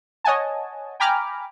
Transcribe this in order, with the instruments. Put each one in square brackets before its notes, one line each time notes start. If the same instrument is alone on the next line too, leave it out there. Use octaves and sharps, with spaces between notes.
[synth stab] C#5 D#5 F#5 G#5 A5
G5 G#5 A#5 B5 D6 F6